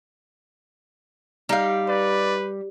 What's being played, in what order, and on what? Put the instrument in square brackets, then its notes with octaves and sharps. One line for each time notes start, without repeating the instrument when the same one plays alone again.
[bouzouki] G3 [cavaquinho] D#4 F5
[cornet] B4 [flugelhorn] D5